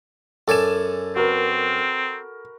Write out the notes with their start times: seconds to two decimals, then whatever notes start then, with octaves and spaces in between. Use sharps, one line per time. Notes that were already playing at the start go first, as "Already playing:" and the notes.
0.48 F#2 A4 D5 G#5 E7
1.16 C4 F#4 A#4 B4